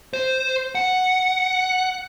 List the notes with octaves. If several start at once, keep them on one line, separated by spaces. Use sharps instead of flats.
C5
F#5